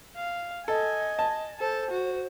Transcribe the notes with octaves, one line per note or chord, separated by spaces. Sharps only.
F5
A4 D#5 G#5
A5
A4 C5
F#4